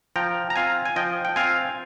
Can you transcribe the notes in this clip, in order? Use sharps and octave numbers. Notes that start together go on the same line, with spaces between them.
F3 G5 A#5
A#5
C4 F4 F5 G#5
G#5
F3 D#5 G5
G5
C4 F4 F5 G#5